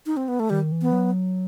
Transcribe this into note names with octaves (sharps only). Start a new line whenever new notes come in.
D#4
C4
B3
A3
D#3 G3
E3
B3
F#3